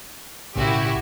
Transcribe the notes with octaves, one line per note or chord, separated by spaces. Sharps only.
B1 A2 C#3 E4 F#4 G4